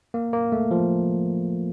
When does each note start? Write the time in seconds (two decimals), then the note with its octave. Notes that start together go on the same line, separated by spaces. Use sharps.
0.14 A#3
0.33 A#3
0.52 A3
0.71 F3